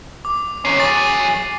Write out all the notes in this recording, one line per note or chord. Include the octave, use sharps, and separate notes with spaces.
D6
D#3 C#4 C7
F#3 G#4 A6